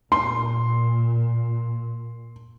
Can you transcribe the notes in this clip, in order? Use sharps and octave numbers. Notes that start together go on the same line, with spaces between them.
A#2 C6